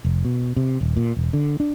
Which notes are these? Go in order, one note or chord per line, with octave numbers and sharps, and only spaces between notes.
F1
B2
C3
D#1
A#2
E1
D3
D4